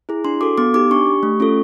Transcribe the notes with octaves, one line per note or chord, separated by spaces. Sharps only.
E4 G#4
D4 C6
F#4 A4 D6
B3 D6
D#4 G4 D6
D4 C#6
G4
A3
C#4 F4 A4